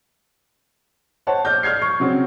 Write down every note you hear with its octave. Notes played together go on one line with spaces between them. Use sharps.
C5 C#5 F#5 A5
D5 F6 G6
F6 G6 G#6 C7
C#6
C#3 F#3 C4